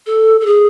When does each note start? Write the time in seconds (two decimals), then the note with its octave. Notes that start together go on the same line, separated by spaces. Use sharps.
0.06 A4
0.41 A4
0.46 G#4